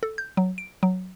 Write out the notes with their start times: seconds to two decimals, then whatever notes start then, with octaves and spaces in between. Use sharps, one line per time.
0.03 A4
0.18 G6
0.37 F#3
0.58 D7
0.83 F#3